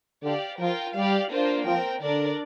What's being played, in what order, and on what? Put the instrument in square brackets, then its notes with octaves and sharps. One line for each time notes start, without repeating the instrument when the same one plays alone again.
[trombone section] D3 [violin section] G4 D5 F5
[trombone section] F3 [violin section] F4 A#4 G5
[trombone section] G3 [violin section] G4 D5 F5
[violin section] A#3 D4 F4 C5
[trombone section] F3 [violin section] C4 A#4 G5
[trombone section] D3 [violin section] D4 A#4 D5